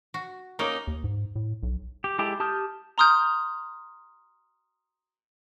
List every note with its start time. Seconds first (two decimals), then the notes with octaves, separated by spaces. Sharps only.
0.14 F#4
0.59 A#3 C#4 D#4 A#5 D6
0.87 D#2
1.04 G#2
1.36 A2
1.63 B1
2.04 G4
2.19 G#3 E4 G4 A4
2.40 G4 A5 D#6 F6 G6
2.98 A#5 C6 D#6 F6 G6